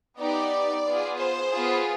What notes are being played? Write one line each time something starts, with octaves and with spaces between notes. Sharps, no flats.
B3 D#4 G4 D5
B3 F4 G#4
C5
B3 F4 G#4